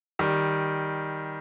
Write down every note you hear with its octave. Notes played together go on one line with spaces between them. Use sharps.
D#3 G3